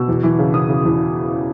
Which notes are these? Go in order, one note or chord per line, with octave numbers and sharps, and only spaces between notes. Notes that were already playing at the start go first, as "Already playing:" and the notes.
Already playing: B2 E6
E2
E3
C#3
C#3 D#6
C#3
E2